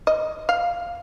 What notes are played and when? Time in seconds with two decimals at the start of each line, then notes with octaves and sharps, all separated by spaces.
0.07 D#5
0.49 F5